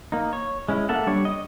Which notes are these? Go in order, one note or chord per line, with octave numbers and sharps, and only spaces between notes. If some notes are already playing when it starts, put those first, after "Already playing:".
A#3 D#4
C#5
G#3 C#4 E4
A#3 A4 E5 F#5
G3 D4 C#5
D#5 D#6